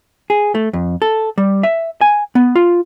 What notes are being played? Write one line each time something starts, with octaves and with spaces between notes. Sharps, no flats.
G#4
A3
F2
A4
G3
E5
G#5
B3
F4